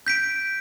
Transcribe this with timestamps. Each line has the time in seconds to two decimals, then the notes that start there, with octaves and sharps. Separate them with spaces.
0.07 G6 B6 D7